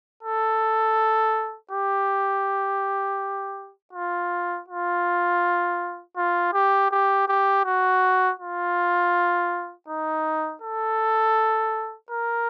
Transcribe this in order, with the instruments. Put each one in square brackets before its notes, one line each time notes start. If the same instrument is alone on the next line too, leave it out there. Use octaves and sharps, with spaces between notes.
[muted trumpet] A4
G4
F4
F4
F4
G4
G4
G4
F#4
F4
D#4
A4
A#4